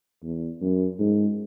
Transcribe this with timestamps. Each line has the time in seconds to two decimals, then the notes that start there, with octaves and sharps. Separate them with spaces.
0.23 E2
0.61 F#2
0.99 G#2